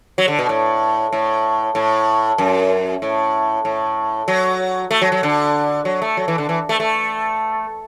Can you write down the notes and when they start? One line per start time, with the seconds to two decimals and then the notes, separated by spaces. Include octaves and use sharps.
0.18 F#3
0.28 D3
0.39 B2
0.49 A2
1.13 A2
1.75 A2
2.38 F#2
3.02 A2
3.65 A2
4.28 F#3
4.91 A3
5.02 F#3
5.12 F#3
5.23 D3
5.85 F#3
6.02 A3
6.17 F#3
6.28 E3
6.38 D3
6.49 E3
6.69 A3
6.80 A3